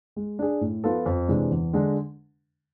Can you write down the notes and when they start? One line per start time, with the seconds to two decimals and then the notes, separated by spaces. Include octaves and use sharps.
0.16 G#3
0.39 D4 G#4
0.61 A2
0.84 F3 B3 F4 A4
1.06 F2
1.28 C3 E3 G#3 D4
1.51 E2
1.73 D3 G#3 D4